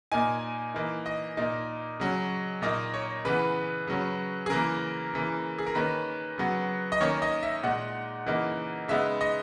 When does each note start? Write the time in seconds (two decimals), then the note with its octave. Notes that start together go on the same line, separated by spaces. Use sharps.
0.12 A#2 A#3 D#4 G#5
0.74 E3 A#3 D#4
1.06 D#5
1.37 A#2 A#3 D#4
2.00 C#3 F#3 C#4
2.62 A#2 A#3 D#4 D#5
2.94 C#5
3.25 C#3 E3 B3 B4
3.88 C#3 F#3 C#4
4.46 G#4
4.50 C#3 E3 A#3 A#4
5.14 C#3 E3 A#3
5.58 G#4
5.66 A#4
5.75 D#3 A#3 C#4 B4
6.38 C#3 F#3 B3
6.92 D#5
7.01 D#3 A#3 C#4 C#5
7.22 D#5
7.43 E5
7.63 A#2 G#3 D#4 F#5
8.26 C#3 E3 A#3 D#4
8.88 C#3 G#3 B3 D#4 E5
9.21 D#5